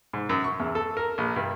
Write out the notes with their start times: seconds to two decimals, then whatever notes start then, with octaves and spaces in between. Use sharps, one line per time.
0.13 G#2
0.29 F#2
0.44 C#6
0.60 E2
0.75 A4
0.97 A#4
1.18 A#1
1.36 G2